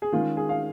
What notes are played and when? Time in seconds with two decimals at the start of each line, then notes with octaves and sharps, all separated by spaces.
0.02 G#4
0.12 D#3 G#3 C#4 F4
0.37 G#4
0.49 F5